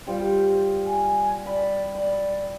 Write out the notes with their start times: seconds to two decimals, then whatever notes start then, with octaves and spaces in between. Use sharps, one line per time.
0.07 G3 F4 C5
0.86 G#5
1.46 D5 B5
1.95 D5 B5